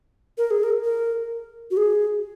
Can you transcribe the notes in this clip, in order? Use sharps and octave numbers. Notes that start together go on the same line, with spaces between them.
A#4
G#4
A#4
A#4
F#4
G#4